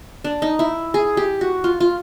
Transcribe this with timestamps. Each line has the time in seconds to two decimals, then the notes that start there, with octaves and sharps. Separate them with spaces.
0.24 D4
0.42 D#4
0.59 E4
0.94 G#4
1.17 G4
1.41 F#4
1.64 F4
1.80 F4